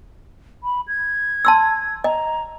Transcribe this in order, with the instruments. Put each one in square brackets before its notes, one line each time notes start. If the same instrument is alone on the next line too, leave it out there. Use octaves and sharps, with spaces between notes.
[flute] B5
G#6
[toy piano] A5 C6 E6
[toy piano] D#5 [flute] A#5